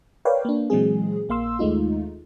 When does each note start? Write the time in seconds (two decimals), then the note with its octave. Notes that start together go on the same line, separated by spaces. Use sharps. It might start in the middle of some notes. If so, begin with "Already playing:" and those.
0.25 A#4 B4 C#5 D5 F5 G5
0.45 A#3 D4
0.70 A#2 E3 F#3 G#3 C4 G#4
1.29 A#1 A#3 F5 C6 E6
1.59 D#2 G#3 A3 D#4 F4